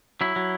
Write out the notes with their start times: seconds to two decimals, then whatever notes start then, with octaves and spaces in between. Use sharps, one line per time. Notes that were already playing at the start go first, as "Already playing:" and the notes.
0.21 F#3 E4
0.36 F#3